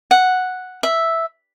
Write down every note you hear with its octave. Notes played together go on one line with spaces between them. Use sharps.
F#5
E5